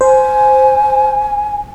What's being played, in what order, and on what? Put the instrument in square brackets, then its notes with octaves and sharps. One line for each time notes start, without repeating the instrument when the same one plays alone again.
[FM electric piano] C5 [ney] G#5